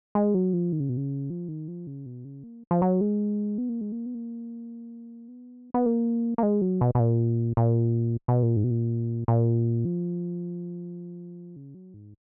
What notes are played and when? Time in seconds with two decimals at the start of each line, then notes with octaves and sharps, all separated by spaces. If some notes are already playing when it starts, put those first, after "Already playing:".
0.15 G#3
0.34 F#3
0.53 F3
0.72 D#3
0.80 C#3
0.89 B2
0.97 C#3
1.30 F3
1.48 D#3
1.68 F3
1.87 C#3
2.06 B2
2.25 C#3
2.44 A#3
2.71 F3
2.82 F#3
3.01 G#3
3.58 B3
3.69 A#3
3.81 G#3
3.92 A#3
4.06 B3
4.15 A#3
5.28 B3
5.74 B3
5.86 A#3
6.38 A#3
6.43 G#3
6.61 F#3
6.81 B2
6.95 B2
7.00 A#2
7.57 A#2
8.28 B2
8.43 A#2
8.56 G#2
8.64 B2
8.71 A#2
9.28 A#2
9.85 F3
11.56 C#3
11.74 F#3
11.94 G#2